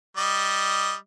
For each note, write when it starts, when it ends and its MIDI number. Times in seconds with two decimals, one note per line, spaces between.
0.17 0.94 55
0.17 0.94 75